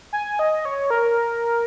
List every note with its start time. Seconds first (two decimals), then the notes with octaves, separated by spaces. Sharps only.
0.13 G#5
0.39 D#5
0.65 C#5
0.90 A#4